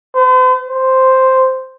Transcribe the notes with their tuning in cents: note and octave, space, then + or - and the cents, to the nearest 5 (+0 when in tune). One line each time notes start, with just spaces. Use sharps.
C5 -45
C5 +0